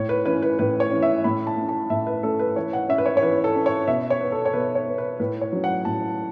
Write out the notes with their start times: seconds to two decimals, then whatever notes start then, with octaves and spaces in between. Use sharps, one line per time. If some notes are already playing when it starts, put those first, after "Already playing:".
Already playing: A2 C#5
0.09 B4
0.25 E3 C#4 B4
0.42 B4
0.59 A2 B4
0.80 C#5
0.91 E3 C#4
1.03 E5
1.24 A2 B5
1.47 A5
1.57 A3 C#4
1.69 A5
1.90 A2 E5
2.07 B4
2.23 A3 C#4 A4
2.39 B4
2.56 E3 C#5
2.73 F#5
2.89 C#4 E5
2.98 B4
3.06 C#5
3.17 C#5
3.22 E3 B4
3.44 A4
3.55 C#4
3.66 C#5
3.88 B2 E5
4.10 C#5
4.21 B3
4.32 A4
4.46 C#5
4.53 B2 B4
4.75 C#5
4.87 B3
4.98 B4
5.20 A2 B4
5.41 C#5
5.53 F#3 C#4
5.64 F#5
5.85 A2 A5